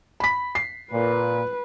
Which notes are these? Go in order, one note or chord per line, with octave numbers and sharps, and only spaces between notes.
B5 B6
C7
A#2 B4